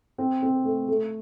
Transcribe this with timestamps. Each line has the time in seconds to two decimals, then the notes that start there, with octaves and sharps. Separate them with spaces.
0.18 C4
0.42 C4
0.65 A3
0.88 A3